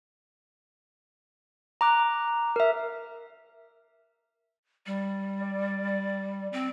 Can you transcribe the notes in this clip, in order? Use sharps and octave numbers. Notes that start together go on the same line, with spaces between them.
A#5 D6 F#6
A#4 E5
G3
D5
C4